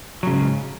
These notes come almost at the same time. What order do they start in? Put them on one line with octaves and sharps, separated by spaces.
F#3 C#3 G#2